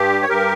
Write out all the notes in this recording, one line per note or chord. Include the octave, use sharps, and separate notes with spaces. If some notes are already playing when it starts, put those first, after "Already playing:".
Already playing: G2 G4
C#5
G2 G4 A#4